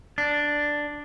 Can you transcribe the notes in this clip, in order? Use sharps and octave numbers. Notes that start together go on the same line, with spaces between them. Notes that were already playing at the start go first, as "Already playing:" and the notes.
D4